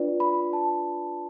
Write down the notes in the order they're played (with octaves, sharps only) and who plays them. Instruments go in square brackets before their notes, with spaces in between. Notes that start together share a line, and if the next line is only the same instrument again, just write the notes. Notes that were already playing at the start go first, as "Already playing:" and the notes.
Already playing: [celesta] D4 F4 B4 D5
B5
A5